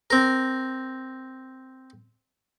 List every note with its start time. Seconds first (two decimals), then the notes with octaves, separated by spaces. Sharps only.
0.10 C4 A#4